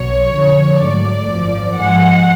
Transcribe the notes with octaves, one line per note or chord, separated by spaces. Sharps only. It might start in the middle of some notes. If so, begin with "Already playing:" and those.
Already playing: B1 B2 F#3 C#5
F2 D3 F3
G#2 F#3 A3 D5
G#1 F#2 F3
G#2 F3 G#3 F#5